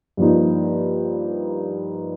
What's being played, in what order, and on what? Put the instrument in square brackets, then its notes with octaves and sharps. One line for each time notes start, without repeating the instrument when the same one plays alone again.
[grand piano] G2 F3 A#3 D#4